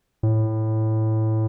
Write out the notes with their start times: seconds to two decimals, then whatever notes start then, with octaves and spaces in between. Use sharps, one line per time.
0.23 A2